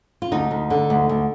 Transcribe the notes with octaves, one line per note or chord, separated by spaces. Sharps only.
F4
D2 D#4
D2
D3
D2
D2